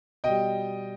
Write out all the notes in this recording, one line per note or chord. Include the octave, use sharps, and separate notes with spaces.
B2 G3 D#5 G5